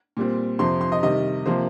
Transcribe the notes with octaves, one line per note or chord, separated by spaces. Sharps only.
A#2 G3 C4
F2 C3 F3 C4 C6
C6
D#5
C3 D#3 G3 D#5
C3 F3 A#3 C5